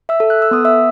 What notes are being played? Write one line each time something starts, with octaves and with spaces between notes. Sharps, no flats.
E5 E6
A4
F#6
E6
B3 D#6
E5 E6